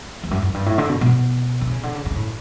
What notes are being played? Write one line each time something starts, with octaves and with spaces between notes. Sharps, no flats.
E2
F#2
F#2
G2
A2
D3
B2
B2
D3
C#3
D3
C#3
C#3
A2